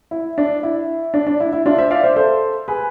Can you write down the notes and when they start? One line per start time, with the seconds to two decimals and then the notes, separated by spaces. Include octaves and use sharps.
0.11 E4
0.38 D4
0.63 E4
1.14 D4
1.27 D4
1.40 E4
1.53 E4
1.66 D4 F4
1.78 C5 E5
1.91 D5 F5
2.04 C5 E5
2.16 A4 C5
2.68 G#4 B4